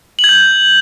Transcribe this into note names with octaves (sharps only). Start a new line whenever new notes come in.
F#7
G#6
G6